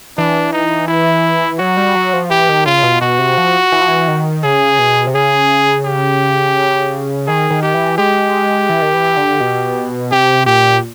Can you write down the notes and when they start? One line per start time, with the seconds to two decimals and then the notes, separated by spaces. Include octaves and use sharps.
0.17 E3 D4
0.52 D#4
0.88 E4
1.59 F#3 F#4
1.77 G3
1.95 F#3
2.13 F3
2.30 E3 G4
2.49 D#3
2.66 C#3 F4
2.83 B2
3.01 B2 F#4
3.19 C3
3.38 F3
3.72 E3
3.81 F3
3.88 E3
4.08 D#3
4.44 C#3 G#4
4.79 B2
5.07 C3
5.14 C#3 G#4
5.85 G4
7.27 D#3 G#4
7.51 D#3
7.62 G4
7.74 E3
7.98 G#3 G4
8.69 E3
8.82 D#3
8.94 E3
9.17 D3
9.41 B2
10.12 C3 G4
10.46 A#2 G4